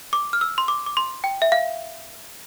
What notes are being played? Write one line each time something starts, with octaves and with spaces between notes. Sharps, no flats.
D6
F6
E6
C6
D6
D6
C6
G5
E5
F5